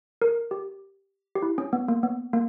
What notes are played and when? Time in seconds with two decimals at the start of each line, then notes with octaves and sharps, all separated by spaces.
0.22 A#4
0.51 G4
1.35 G4
1.42 E4
1.58 C#4
1.73 B3
1.88 A#3
2.03 B3
2.33 A#3